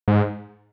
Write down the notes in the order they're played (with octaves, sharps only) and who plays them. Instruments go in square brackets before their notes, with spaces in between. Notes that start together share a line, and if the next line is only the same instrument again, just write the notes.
[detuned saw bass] G#2